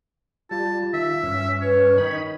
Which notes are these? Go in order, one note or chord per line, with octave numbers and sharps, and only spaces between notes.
G3 F4 A5
D#3 E5
G2 C#4
B4 C#5
D#3 D#4 B5